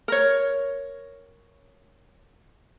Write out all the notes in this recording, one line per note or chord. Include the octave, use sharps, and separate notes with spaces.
A#4 C#5